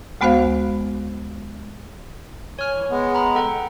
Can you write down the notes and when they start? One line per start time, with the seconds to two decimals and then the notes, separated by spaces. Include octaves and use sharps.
0.21 D2 G#3 B3 F#4 C5 F5
2.59 C#5 G#5 F6
2.75 E3
2.90 G#3 B3
3.15 A#5 B5
3.36 A4 F#5 G5